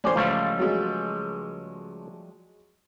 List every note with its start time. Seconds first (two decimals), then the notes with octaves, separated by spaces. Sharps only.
0.04 A1 C#4 C5 D5
0.16 C#2 F3 G3 A3 F5
0.59 F#3 G#3